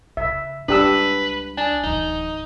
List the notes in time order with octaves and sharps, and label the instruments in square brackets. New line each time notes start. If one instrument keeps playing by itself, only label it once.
[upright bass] C#3 [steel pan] E5
[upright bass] C#2 G3 [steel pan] D4 G4 E6 [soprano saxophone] B4
[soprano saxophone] D4 [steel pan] G#5
[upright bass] D1 E3 [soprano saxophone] D#4